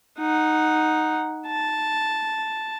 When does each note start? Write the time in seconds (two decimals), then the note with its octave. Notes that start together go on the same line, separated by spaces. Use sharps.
0.18 D#4 F#5
1.47 A5